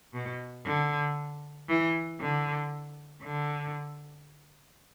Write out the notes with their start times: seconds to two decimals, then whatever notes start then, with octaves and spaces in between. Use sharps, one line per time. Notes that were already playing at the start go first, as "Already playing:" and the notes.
0.14 B2
0.66 D3
1.69 E3
2.21 D3
3.23 D3